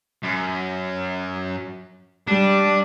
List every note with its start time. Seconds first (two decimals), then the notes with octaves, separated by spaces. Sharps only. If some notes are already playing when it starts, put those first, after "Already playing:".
0.23 F#2
2.28 G3 D4